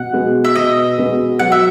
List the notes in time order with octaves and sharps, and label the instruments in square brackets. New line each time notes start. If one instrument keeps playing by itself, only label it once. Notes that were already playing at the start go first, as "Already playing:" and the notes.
Already playing: [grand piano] B2 [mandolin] F#5
[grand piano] G#3 B3 F#4
[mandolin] E5
[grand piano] B2 [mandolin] D#5
[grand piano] G#3 B3 F#4
[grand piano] F#3 [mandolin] F#5
[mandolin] E5